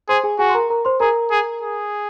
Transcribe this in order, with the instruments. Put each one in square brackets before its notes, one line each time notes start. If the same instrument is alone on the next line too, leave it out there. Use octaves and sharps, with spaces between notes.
[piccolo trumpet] G#4 [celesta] C5 C6
[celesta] G#4 G#5
[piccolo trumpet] F#4 [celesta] G#4 G#5
[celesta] C6
A#4 A#5
A#4 A#5
C5 C6
[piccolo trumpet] G#4 [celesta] A#4 A#5
[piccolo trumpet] G#4
G#4